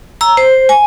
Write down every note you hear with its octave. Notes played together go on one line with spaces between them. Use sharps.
A#5 E6
C5
G#5